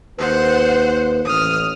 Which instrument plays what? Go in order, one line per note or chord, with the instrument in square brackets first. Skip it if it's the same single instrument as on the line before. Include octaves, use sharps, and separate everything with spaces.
[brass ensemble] D#2 B4 [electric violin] C5 F#5
[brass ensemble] A1 [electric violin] D#6 F6